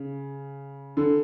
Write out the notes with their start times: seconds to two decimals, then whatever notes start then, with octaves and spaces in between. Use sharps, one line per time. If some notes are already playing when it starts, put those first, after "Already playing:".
Already playing: C#3
0.97 D3